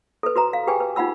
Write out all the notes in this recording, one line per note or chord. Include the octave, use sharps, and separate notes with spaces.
A4 B4
F#4 B4 A#5
F5
G4 G#4 B4 G5 G#5
B4
D#4 F4 F#5 B5 E6